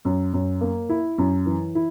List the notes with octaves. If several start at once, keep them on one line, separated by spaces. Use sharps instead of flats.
F#2
F#2
A#3
E4
F#2
E3
E4